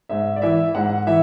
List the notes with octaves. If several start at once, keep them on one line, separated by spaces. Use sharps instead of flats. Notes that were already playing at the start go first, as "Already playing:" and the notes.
G#2 E5
D5
E3 E5
G#2 F#5
E3 E5